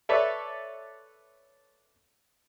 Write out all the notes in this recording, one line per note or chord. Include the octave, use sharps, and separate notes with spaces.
A4 B4 C#5 D5 E5